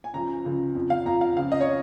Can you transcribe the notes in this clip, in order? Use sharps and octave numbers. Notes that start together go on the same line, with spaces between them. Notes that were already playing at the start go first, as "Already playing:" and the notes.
G#5
C#2 C#3 F3 A#5
C#2 C#3 F3
F2 F3
F5
F2 F3 A#5
F5
C#2 C#3 F3 F5
D#5
C#5